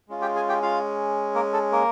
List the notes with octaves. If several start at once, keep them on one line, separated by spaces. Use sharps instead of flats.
G#3 C#4 F4
G4 G5
G#4 G#5
G4 G5
F4 F5
A#3 A#4
A4
A#3 A#4